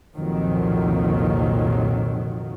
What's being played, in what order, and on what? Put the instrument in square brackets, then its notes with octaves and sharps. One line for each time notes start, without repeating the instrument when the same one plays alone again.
[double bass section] C2 F2 A#2 D#3 F3 F#3